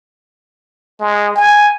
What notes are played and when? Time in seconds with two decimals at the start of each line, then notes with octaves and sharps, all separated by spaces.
1.00 G#3
1.36 G#5